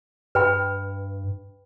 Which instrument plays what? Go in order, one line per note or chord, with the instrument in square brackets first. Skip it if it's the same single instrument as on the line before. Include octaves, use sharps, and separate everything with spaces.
[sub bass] G2 [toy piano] B4 G5 B5